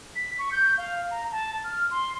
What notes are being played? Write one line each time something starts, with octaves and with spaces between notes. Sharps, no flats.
B6
C#6
G6
F5
A#5
A5
F6
C6